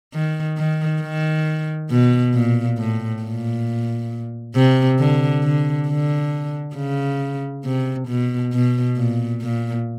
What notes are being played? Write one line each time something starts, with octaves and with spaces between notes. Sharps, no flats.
D#3
D#3
D#3
B2
A#2
A2
A#2
C3
D3
D3
D3
C#3
C3
B2
B2
A#2
A#2